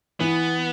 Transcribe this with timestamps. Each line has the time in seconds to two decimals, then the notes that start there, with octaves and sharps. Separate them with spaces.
0.20 E3 B3